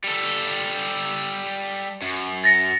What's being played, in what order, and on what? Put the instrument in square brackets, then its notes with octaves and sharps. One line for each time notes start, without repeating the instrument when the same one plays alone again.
[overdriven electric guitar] G3 A4
F#2
[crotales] A6 A#6 C#7